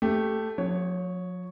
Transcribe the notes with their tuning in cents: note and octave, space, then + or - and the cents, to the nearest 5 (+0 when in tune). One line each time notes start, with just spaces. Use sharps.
A3 +0 G4 +0
F3 +45 C#5 +0